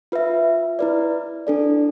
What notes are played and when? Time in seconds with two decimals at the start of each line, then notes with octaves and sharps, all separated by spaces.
0.12 F4 B4 E5
0.79 E4 B4 D5
1.47 D4 A4 D5